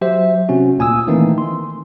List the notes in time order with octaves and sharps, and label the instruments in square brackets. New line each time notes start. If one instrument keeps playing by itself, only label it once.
[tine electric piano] F#3 G4 C5 E5
C3 C4 C#4 F#4
D2 A#2 G#5 D#6 E6
D#3 E3 A3 A#3 C4 D#4
C6